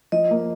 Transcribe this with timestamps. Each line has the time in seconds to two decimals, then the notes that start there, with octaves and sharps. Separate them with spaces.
0.12 F3 D#5
0.31 A#3